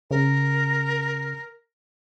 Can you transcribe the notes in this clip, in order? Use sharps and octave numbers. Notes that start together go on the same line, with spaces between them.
C#3 A#4